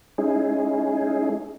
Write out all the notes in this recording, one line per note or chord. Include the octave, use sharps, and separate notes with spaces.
G#3 C#4 D#4 E4 G#4